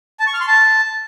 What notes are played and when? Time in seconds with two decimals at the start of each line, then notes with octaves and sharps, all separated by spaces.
0.20 A5
0.27 C#6
0.34 F6
0.41 C6
0.48 A5